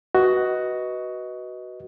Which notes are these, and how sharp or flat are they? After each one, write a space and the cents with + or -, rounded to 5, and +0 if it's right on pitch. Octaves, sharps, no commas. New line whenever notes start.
F#4 +10 B4 -10 D#5 +10